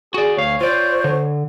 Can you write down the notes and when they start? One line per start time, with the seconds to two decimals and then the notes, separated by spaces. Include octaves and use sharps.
0.14 F#4 G#4 D5
0.37 D2 C#5 F5
0.61 F4 C5 D5
1.04 D3